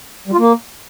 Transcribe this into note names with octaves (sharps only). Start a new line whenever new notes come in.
G3
F4
A#3